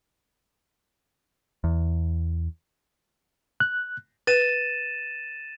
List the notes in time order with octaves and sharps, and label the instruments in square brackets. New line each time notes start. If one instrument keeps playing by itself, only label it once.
[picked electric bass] E2
[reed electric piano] F#6
[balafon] B4 [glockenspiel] A6 D#7 E7